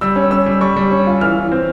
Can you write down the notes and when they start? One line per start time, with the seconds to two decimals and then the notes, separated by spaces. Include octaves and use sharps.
0.01 G3 E6
0.16 C#4
0.31 C#4 E6
0.46 G3
0.61 G3 C#6
0.76 G3
0.92 C#4
1.07 F4
1.21 E3 F6
1.36 E3
1.52 C4